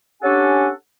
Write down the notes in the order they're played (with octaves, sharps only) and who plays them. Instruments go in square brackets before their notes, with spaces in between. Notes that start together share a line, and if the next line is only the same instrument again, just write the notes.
[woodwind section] C#4 D4 G4 A4 F#5 G#5